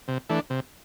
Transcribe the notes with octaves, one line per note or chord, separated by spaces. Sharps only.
C3
E3 A3 D4
C3